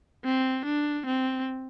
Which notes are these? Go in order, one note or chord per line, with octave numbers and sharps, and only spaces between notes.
C4
D4
C4